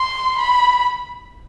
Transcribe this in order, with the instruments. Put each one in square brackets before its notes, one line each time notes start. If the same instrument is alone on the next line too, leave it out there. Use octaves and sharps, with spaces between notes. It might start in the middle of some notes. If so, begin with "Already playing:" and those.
Already playing: [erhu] C6
B5